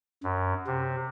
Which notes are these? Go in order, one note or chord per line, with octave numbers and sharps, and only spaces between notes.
F#2
C3